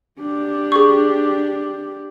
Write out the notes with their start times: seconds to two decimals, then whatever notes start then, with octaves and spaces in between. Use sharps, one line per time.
0.20 D4 G4
0.72 G#4 C#6